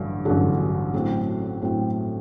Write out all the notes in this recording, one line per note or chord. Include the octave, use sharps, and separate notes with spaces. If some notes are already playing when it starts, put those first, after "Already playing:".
Already playing: A1 G2 D3 F#3
A1 G2 D3 F#3
A2 F#3 C4
A2 F#3 C4